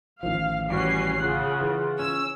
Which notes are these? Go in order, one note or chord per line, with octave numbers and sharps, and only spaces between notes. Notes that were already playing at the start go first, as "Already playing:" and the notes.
A1 D#3 F3 F5
E3 G3 C#4 F#4 C7
C#3 F4 F#5
E3
C#4 E6